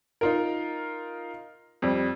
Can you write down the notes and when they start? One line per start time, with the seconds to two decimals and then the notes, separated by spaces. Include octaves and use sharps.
0.21 D#4 F4 A#4
1.82 F2 G3